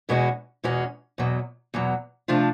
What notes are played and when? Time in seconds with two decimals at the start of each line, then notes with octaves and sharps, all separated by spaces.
0.09 E2 B2 G#3 C#4 F#4
0.64 E2 B2 G#3 C#4 F#4
1.18 E2 B2 F#3
1.74 E2 B2 F#3
2.28 C3 F3 A3 D4 F4